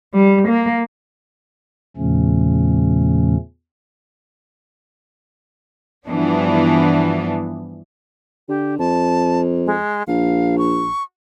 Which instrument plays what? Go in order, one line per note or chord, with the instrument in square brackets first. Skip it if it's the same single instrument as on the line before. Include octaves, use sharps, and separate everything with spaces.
[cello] G3
A#3
[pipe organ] E2 A#2 C#3 F3 A3 C#4
[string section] G2 E3 F3 B3 D4
[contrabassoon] D3 [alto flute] G4
[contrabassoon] F2 [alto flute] A5
[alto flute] G#3
[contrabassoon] A#1 [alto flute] F5
[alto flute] C#6